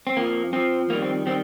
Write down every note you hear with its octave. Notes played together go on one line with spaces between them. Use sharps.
C4
F2 F3 A#3
F2 F3 C4
F2 D#3 G3 A#3
C4
D#3 G3 C4